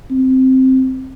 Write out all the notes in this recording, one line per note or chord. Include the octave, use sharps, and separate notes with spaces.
C4